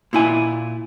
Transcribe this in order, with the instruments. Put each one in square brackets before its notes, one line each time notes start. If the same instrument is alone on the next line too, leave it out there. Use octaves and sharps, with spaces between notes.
[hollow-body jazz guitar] A#2 E4 G#5